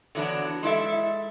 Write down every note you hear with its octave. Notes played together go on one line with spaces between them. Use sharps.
D3 E3 F#3 B3 D4
G#3 E4 A4 E5